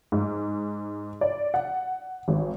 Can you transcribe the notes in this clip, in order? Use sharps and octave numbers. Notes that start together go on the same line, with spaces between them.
G#2
D5
F#5
G#1